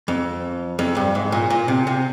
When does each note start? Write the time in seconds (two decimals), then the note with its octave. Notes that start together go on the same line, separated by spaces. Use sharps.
0.08 F2
0.79 F2
0.97 G2
1.15 G#2
1.32 A#2
1.50 A#2
1.68 C3
1.87 C3